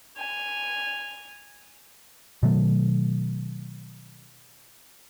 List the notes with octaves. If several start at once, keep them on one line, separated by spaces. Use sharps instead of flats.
G#5 F7
B2 D#3 F#3 A3